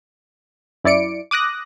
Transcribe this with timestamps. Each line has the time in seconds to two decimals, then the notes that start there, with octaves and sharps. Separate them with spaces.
0.84 F#2 E4 D5 C#7 D7
1.31 D6 D#6 F#6 A#6